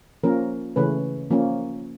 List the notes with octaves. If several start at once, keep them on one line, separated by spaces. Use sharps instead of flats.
F3 A#3 C#4 A#4
C#3 E3 A3 C#4 B4
F3 A#3 C#4